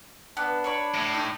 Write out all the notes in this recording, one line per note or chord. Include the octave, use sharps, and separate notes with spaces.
B3 D4 B4
C#5 D5 B5
A2
D#4